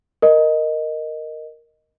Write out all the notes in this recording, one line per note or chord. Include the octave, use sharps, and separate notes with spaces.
A#4 D#5